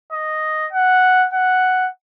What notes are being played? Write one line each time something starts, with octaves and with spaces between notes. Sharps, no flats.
D#5
F#5
F#5